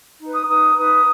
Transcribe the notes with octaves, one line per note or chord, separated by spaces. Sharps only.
D#4 B4
D#6
D#4 B4 D#6
D#4 B4 D#6